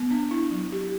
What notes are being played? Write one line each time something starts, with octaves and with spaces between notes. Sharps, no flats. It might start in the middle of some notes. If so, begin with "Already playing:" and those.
Already playing: B3
D4
E4
F#3
G4